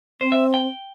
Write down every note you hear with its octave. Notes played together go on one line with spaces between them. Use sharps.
C4 C5
E5
G5